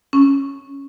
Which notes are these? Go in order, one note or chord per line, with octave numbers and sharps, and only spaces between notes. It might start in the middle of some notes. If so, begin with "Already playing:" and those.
C#4